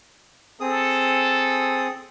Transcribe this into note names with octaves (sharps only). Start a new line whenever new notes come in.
C4 G#4 A4 D#6